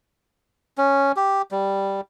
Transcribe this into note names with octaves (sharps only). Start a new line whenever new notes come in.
C#4
G4
G3